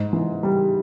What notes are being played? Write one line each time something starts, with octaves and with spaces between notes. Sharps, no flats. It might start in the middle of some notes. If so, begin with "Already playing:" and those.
Already playing: G#2
E3
G3